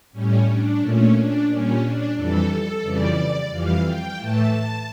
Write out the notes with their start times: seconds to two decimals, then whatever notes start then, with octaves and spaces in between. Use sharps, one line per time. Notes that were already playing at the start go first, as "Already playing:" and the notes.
0.13 A2 G3 C#4
0.47 D4
0.80 A#2 A3 C#4
1.13 D4
1.48 A#2 G3 C#4
1.81 D4
2.15 F2 E3 G3 A4
2.49 A4
2.82 F2 C#3 E3 G3 D5
3.50 F2 E3 G3 F5
3.83 G5
4.17 A2 E3 A3 A5
4.52 A5